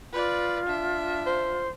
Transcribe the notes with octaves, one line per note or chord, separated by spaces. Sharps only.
F4 B4 D5
D4 E5
C5